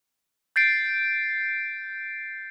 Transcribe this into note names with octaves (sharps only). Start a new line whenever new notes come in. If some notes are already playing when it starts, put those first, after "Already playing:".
G6 A6 C7 D7